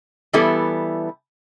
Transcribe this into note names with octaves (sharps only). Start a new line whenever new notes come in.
E3 G3 B3 E4 A4